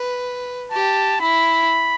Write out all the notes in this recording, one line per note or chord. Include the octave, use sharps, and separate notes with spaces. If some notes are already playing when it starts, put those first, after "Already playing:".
Already playing: B4
G4 A5
E4 B5